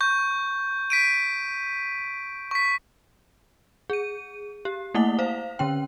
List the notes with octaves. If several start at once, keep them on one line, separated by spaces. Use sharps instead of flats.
C#6 G6
B6 D7 D#7
C#6 B6
G#4 D#7
G4
A3 A#3 E4 F#5 G7
C5 F5
D3 C#4 G5